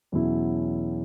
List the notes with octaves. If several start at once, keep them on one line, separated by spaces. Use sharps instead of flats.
E2 B2 F#3 C#4 E4